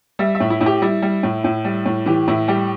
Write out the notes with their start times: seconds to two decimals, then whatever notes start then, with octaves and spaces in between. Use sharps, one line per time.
0.19 G3 E5
0.35 E5
0.40 A2
0.50 E4
0.61 A2 E4
0.66 G4
0.82 G3 E4
1.02 G3
1.23 A2
1.44 A2
1.65 G3
1.86 A2
2.06 E3 G4
2.28 A2 E4
2.48 G3 G4